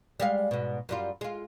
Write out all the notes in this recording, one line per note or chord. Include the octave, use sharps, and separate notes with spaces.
G3 G#3 F5
G#2 B2
F#2 G3 F4
G#3 F4